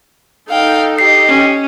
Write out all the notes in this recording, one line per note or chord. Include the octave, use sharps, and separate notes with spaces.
D#4 A4 F5 G5
G4 D#5 C7
C#4